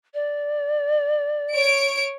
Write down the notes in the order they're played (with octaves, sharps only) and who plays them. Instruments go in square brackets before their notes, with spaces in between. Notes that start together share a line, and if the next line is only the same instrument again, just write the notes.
[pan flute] D5
[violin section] C#5 D7